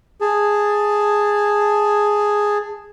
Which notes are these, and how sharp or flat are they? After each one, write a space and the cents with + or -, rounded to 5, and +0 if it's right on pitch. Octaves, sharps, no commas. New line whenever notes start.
G#4 +0 A5 +0